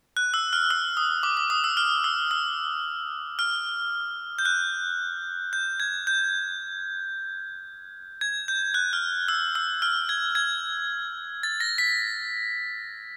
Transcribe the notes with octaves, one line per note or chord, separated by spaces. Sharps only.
F#6
E6
F6
E6
D#6
D6
D6
D#6
E6
F6
E6
E6
F6
G6
F#6
G6
G#6
G6
G#6
G6
F#6
F6
E6
E6
F6
G#6
G#6
A6
A#6
B6